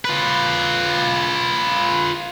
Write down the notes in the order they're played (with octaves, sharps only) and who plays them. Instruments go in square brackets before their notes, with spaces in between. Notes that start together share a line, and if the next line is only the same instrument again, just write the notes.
[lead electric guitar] F4 B4